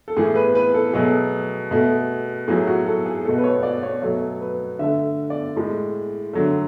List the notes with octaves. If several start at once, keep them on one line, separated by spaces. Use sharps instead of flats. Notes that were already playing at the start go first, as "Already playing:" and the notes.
A4
A2 E3 A3 G#4
B4
B4
A4
B2 F#3 A3 G#4
B2 A3
A2 F#3 A3 G#4
F#4
A4
G#4
B2 A3 A4
B4
C#5
D5
C#5
B2 F#3 A3 C#5
B4
D3 A3 E5
D5
A2 G#3
D3 F#3 A3